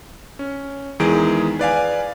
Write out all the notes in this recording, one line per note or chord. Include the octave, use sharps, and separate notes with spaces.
C#4
E2 D#3 E3 G#3 G#4 D7
B4 D5 F5 G#5